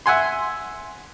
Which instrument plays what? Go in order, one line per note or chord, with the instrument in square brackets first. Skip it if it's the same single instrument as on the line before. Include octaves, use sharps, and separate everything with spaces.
[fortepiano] E5 F#5 G#5 C6